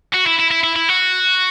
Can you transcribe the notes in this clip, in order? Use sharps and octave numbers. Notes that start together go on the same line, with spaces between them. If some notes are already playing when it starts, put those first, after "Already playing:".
F#4
E4
E4
E4
E4
E4
F#4